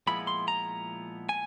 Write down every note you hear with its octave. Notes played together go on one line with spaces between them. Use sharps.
A#2 F3 G#3 B3 E4 B5
C6
A#5
G#5